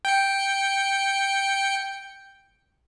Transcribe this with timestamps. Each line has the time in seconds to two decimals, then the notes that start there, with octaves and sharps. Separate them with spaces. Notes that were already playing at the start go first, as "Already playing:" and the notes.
0.05 G5 C#7